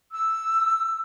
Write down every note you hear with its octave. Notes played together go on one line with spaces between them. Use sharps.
E6